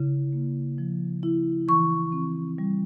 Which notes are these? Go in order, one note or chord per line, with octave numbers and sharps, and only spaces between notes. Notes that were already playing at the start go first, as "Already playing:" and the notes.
Already playing: C#3 E4
A#3
F3
E4
E3 C#6
C4
G3